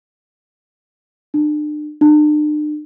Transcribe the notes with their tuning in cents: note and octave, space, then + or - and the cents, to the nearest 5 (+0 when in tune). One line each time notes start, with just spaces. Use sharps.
D4 +40
D4 +45